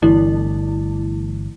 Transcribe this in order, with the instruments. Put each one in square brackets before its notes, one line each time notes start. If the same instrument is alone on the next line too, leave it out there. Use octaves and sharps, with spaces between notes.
[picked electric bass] G1 [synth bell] E3 A3 E4